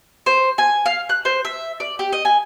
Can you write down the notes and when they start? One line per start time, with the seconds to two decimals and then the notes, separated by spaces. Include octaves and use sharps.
0.26 C5
0.58 G#5
0.86 F5
1.09 F#6
1.25 C5
1.45 E5
1.80 D5
1.99 G4
2.13 D#5
2.25 G#5